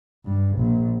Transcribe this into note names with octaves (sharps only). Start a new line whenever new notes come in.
G2
A#1